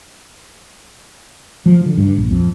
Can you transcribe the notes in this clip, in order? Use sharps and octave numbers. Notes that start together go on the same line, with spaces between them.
F3
D3
G2
A#1
F2